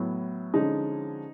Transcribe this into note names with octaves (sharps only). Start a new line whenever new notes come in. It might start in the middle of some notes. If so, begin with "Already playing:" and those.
Already playing: A2 F#3 B3
D3 F3 G#3 C#4 D#4